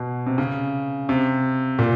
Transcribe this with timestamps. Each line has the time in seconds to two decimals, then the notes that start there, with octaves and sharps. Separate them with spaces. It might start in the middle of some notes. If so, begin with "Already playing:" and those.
Already playing: B2
0.27 C3
0.38 C#3
1.09 C3
1.79 A#2